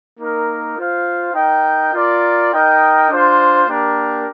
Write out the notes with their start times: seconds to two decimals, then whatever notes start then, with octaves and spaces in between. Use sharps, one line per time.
0.18 A#3 D#4 A#4
0.77 F4 C5 F5
1.34 D#4 A#4 D#5 G5
1.93 F4 A#4 D5
2.52 D#4 A#4 D#5 G5
3.09 D4 F4 C5
3.68 A#3 D4 G4 A#4